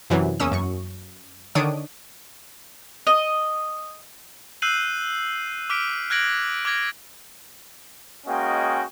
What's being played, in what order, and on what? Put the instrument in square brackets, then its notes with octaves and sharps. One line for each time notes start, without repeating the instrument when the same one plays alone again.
[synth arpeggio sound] F#2 C3 E3 F#3
E2 A#3 C#4 D#6 E6
F#2 C#6
D3 D#3 D4 C#5 D#6 D7
[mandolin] D#5
[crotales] E6 F#6 G6 C7 D#7 F#7
D6 F6 B6 D7
F6 F#6 G#6 A#6 D7 F#7
D6 F6 G#6 A#6
[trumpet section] G#3 A#3 C#4 F#4 D#5 G5